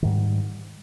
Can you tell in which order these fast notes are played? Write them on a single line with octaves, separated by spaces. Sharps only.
D#3 G#2 G3